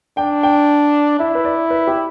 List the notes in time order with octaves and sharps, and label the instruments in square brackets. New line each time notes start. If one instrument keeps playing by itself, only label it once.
[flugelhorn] D4 [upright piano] G5
[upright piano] G5
[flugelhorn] E4 [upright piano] E5
[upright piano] B4
D5
B4
G4